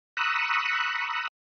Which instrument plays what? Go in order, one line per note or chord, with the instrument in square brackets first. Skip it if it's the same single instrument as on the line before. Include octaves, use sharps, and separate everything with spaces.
[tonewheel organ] A#5 B5 C#6 D#6 E6 F#6